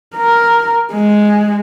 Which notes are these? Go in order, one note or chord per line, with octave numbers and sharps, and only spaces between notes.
A#4
G#3